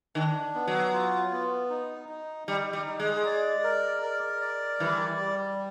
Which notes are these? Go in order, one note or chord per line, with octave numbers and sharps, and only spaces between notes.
D#3 D4
B3
F#3
F4
B3
D#4
D#4
G3 D#4
G3
D#4
G#3
D5
A#4
A#4
D5
E3 G3
G3